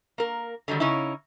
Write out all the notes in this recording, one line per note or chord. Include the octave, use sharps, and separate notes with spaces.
A#3 A#4
D3 D#3 F#3 G3
C#3 C#4 D#4 E4